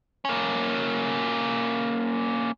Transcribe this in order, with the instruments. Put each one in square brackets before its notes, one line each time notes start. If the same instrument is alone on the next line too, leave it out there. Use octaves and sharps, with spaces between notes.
[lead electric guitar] A#3 C#4